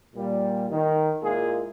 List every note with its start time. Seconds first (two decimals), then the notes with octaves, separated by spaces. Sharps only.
0.14 A#2 G3
0.70 D#3
1.22 A#2 G#3 A#3 E4 F4 G#4